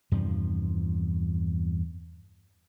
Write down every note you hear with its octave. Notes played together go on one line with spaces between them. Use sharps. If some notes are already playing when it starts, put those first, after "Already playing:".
E2 G2 C3 F3